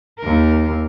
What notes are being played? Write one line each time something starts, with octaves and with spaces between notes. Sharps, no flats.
D#2 A#4